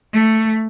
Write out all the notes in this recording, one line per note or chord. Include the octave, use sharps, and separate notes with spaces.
A3